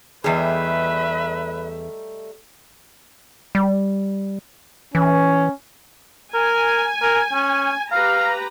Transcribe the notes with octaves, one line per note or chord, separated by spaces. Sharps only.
E2 G3 A3 D#4 G#4 B4 E5
G3
E3 C#4
A#4 G#5
A#4
C#4
G4 B4 F5 A#5